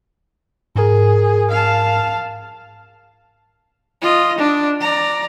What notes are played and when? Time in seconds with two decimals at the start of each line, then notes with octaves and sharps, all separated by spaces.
0.76 G#2 G#4 A#4
1.50 F5 A5
4.02 F4 D#5
4.38 D4
4.81 D5 A#5